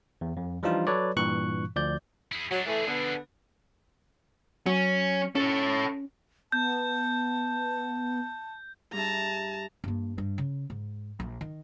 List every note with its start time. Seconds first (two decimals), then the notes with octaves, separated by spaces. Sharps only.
0.21 E2
0.37 F2
0.63 E3 F3 G3 D4 D#4 F4
0.87 F#3 A4 B4 C#5 D5
1.16 G2 A#2 E3 C#6 F#6
1.76 D2 F3 D5 G6
2.32 E4 G#4
2.51 F#3 G#3 D4
2.66 E3 A3 D4 G#4
2.87 D3 B3
4.66 F#3 C#4
5.35 C#4 A4 C#5
6.52 B3 A5 G6
8.93 G2 G#4 E5 A5 A#5
9.84 G2 A#3
10.18 G2
10.38 C#3
10.70 G#2
11.20 A#1
11.41 D#3